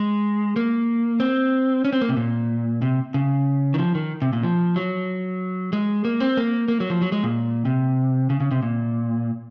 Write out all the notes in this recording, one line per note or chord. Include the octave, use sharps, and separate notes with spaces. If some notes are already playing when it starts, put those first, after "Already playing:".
Already playing: G#3
A#3
C4
C#4
C4
A#3
C3
A#2
C3
C#3
D#3
F3
D#3
C3
A#2
F3
F#3
G#3
A#3
C4
A#3
A#3
F#3
F3
F#3
G#3
A#2
C3
C#3
C#3
C3
A#2